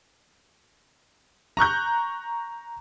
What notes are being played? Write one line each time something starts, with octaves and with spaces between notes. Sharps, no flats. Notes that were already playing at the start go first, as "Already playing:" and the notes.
A#5 C#6 F#6 G6